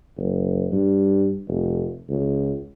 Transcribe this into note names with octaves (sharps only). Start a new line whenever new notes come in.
F#1
G2
F1
C#2